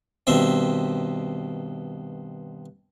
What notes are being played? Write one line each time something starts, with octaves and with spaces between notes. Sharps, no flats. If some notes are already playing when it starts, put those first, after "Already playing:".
G2 B2 D#3 C4 E5